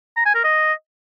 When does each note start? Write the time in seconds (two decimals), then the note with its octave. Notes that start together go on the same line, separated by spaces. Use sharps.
0.17 A#5
0.26 G#5
0.35 A#4
0.44 D#5